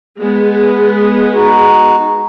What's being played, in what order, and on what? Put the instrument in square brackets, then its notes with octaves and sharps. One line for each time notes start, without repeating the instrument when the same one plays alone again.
[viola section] G#3 B3
[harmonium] D#4 F#4